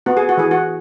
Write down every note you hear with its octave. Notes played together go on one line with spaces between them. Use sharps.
B3 F#4
G#4
F#4
E3 G#4
F#4